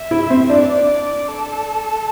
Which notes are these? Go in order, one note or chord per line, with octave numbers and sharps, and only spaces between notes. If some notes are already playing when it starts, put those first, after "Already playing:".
Already playing: E5
E4
C4
D4 D5
D5
A4